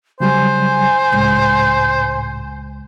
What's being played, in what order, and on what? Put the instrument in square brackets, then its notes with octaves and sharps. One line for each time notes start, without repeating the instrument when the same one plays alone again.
[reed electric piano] C#3 F#3 G3 [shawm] C5 [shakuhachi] G#5
[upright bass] C#2 G#3 [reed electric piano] A2